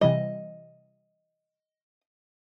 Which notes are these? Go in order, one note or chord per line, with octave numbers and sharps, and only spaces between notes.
C3 E3 G3 D#5